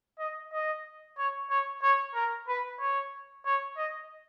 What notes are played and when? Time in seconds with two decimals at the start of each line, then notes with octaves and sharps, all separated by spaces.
0.19 D#5
0.52 D#5
1.18 C#5
1.50 C#5
1.82 C#5
2.14 A#4
2.48 B4
2.80 C#5
3.46 C#5
3.77 D#5